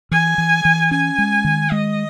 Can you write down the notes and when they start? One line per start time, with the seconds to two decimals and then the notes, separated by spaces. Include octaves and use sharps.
0.11 E3 G#5
0.38 E3
0.65 E3
0.91 C#4 G#5
1.18 G#3
1.44 D#3
1.71 G#3 D#5